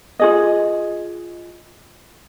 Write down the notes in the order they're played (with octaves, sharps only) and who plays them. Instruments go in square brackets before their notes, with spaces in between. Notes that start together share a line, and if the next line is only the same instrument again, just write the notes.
[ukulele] F4 G#4 D#5